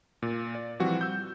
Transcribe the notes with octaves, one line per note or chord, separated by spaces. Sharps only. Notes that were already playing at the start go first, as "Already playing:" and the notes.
A#2
D5
E3 F3 G3 C4 F#4
E6 G6